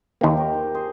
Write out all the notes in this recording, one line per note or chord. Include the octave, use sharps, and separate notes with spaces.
D#2 D#3 A#3 G4 A#4
G4 A#4
C5
G#4 C5